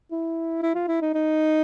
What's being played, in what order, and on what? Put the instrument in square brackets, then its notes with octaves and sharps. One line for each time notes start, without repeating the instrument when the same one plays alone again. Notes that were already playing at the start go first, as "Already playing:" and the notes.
[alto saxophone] E4
E4
F4
E4
D#4
D#4